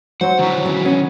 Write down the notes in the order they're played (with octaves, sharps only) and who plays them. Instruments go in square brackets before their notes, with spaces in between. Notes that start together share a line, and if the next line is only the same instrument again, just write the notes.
[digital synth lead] F#3 [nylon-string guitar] C5 [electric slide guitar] F#5
[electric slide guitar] D3 D#3 E4 [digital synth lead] F#3
[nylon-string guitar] C#3 B3
[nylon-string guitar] B3 [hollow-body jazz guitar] C#4